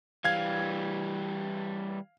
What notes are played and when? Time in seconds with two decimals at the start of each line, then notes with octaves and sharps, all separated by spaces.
0.24 E3 G3 F5 G#6